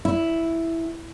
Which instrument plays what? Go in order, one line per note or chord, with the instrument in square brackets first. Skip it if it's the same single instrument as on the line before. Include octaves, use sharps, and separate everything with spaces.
[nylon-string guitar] E4